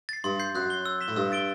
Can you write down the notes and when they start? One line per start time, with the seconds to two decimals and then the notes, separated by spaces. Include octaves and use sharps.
0.09 A6 C7
0.24 G2 C6
0.39 G6 C7
0.55 F#2 F#6
0.70 C7 G7
0.86 E6
1.01 B6 E7 G7
1.08 A2
1.16 G2 E6
1.32 A6 D7 G7